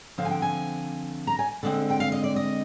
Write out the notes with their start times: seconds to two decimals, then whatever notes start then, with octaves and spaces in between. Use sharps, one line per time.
0.18 D3 F3 C4 F5
0.25 G#5
0.30 G5
0.42 G#5
1.27 A#5
1.39 G#5
1.63 D3 G#3 C4
1.90 G5
2.00 F5
2.12 D#5
2.24 D5
2.36 D#5